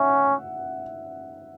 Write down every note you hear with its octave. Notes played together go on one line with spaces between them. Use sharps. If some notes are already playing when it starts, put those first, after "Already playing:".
Already playing: C#4 E5 F#5